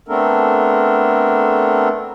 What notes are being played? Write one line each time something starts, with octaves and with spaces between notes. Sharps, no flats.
A3 B3 C4 D4 A4 A#4